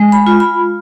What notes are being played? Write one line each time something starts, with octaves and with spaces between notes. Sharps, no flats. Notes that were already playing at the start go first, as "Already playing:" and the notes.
Already playing: G#3
B5
F4
B5